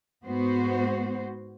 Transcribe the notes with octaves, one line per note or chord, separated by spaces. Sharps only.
G#2 B3 F#4 C5